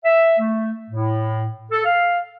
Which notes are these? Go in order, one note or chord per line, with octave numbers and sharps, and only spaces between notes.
E5
A3
A2
A4
F5